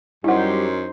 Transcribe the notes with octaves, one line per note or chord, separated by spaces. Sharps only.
F#2 G3 D#4 E4 G4 C5 F#5